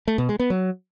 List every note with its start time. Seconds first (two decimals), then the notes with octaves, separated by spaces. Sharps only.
0.08 A3
0.18 B2
0.29 G#3
0.40 B3
0.50 F#3